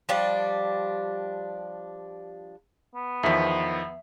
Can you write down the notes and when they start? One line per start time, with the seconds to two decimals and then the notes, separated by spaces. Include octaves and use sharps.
0.09 F3 G3 D4
2.95 B3
3.23 E2 D#3 F3 E5 B6